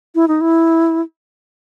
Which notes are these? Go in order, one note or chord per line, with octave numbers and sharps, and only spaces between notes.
E4
D#4
E4